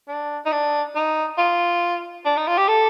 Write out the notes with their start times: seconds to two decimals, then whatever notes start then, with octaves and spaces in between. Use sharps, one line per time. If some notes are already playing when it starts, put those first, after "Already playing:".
0.08 D4
0.46 D#4
0.52 D4
0.96 D#4
1.38 F4
2.25 D4
2.37 D#4
2.48 F4
2.58 G4
2.68 A4